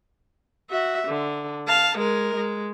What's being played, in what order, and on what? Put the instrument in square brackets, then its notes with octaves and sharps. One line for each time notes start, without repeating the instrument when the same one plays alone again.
[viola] F#4 E5
D3
F5 A5
G#3 A#4
G#3